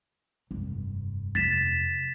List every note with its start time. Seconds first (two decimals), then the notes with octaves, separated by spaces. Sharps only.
0.51 F1 G2
1.35 F2 C3 A6 B6 E7